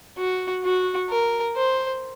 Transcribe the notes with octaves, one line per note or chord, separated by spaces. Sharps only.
F#4
F#4
A#4
C5